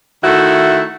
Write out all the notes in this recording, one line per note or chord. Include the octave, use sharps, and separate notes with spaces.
D#3 A3 E4 F#4